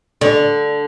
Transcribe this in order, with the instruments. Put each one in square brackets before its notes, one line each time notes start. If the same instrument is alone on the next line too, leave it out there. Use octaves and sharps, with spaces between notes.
[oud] D3